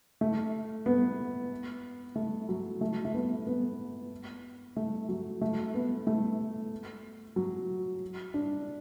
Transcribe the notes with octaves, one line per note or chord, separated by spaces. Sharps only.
A3
B3
A3
F#3
A3
A3
B3
B3
A3
F#3
A3
B3
A3
F#3
D4